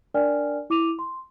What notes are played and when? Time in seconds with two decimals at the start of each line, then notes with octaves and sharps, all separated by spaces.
0.14 D4 A#4 D5 G5 G#5 F6
0.70 E4 D6 D#7 F7
0.99 C6